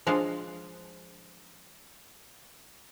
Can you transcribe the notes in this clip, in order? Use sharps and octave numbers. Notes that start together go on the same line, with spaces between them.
F3 G#3 D4 D#5 F5